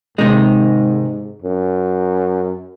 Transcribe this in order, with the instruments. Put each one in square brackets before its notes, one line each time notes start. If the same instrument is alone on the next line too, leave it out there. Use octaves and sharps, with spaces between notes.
[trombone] G#2 [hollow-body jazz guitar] C3 D#3 G#3 D#4
[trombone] F#2